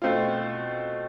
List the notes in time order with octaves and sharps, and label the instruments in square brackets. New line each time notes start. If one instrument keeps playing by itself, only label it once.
[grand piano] B2 A3 C4 F4